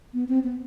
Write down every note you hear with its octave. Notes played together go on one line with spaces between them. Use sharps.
B3
C4
B3